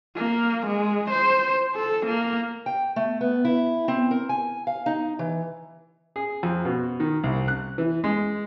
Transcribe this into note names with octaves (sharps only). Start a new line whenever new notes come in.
A#3
G#3
C5
A4
A#3
G5
A3
B3
E4
C4
A#4
G#5
F5
D#4
E3
G#4
F2
B2
D#3
C2
F#6
E3
G#3